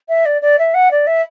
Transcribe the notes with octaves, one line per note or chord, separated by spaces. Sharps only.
E5
D5
D5
E5
F#5
D5
E5